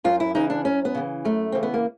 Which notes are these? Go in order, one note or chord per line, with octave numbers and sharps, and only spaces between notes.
F#2 F4
E4
C#3 E3 D#4
D4
F#2 C#4
B3
C#3 E3
F#2 A3
C#3 E3 C4
B3
A#3